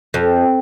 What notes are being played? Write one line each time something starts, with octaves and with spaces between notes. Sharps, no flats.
F2